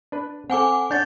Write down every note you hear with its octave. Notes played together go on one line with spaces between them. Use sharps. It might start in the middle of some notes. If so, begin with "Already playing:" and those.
D4 B4
C4 A4 F#5 G#5 D6
D4 C#5 F#5 G6 A6